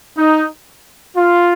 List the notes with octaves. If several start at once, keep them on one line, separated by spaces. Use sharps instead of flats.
D#4
F4